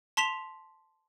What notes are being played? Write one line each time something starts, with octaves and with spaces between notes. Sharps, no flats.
A5 C6 B6 E7 F7